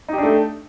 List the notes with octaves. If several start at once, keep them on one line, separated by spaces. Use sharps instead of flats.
A3 D4 D#4 G4